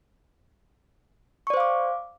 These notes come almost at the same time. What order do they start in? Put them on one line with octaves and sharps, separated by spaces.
C#6 D5 C5 F5 D6